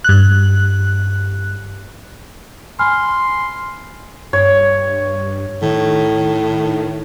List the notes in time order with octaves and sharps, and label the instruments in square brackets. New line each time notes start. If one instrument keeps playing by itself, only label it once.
[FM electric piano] G2 F#6
[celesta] G#5 B5 F6 [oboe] C6
[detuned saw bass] G2 [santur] C#5
[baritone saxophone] A2 [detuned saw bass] D#3